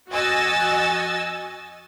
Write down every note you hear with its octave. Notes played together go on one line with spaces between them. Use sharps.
F2 F#4 D#5 G#5 E6 A6